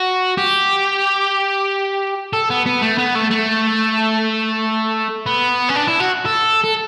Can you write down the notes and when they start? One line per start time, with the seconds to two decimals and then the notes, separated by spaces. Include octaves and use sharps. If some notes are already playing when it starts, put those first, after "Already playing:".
Already playing: F#4
0.38 G4
2.33 A4
2.50 B3
2.66 B3
2.82 A3
2.98 B3
3.15 A3
3.31 A3
5.26 B3
5.69 C#4
5.76 D4
5.88 E4
6.00 F#4
6.25 A4
6.64 A4